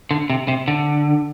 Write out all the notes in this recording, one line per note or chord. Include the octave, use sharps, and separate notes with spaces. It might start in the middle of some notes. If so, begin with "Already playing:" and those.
D3
C3
C3
D3